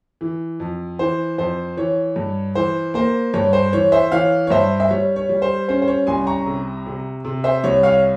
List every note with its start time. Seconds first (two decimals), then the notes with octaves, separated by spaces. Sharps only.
0.21 E3
0.60 F2
0.99 E3 C5
1.38 F2 C5
1.77 E3 C#5
2.16 G2
2.55 E3 C5
2.94 A#3 C5
3.33 G2 C#5
3.53 C5
3.73 E3 C#5
3.92 C5 E5
4.12 E3 C#5 F5
4.47 C#5
4.50 G2 C5 E5
4.80 E5
4.90 G3 C#5
5.16 C#5
5.29 G3
5.42 C5
5.68 C#4 C5
5.82 C5
5.88 C#5
6.07 C2 G#5 C6
6.27 A#5 C#6
6.46 C3
6.86 C3
7.25 C3
7.44 C5 E5
7.64 C2 C#5
7.83 C#5 F5